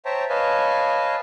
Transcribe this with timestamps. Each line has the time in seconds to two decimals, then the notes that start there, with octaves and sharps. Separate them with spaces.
0.05 C5 C#5 E5 G5 A5 A#5
0.29 B4 C#5 D#5 F5 G#5 A5